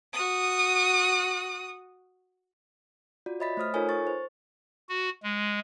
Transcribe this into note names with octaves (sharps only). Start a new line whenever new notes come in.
F#4 D#6
F4 F#4 D5
C#5 D#5 E5 B5 A6 B6
A3 C5 D#6 F6
D#4 F4 A4 A#4 C#5 G#5
C#6 A6
C5
F#4
G#3